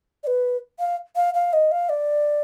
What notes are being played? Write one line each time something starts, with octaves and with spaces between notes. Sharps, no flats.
D5
B4
F5
F5
F5
D#5
F5
D5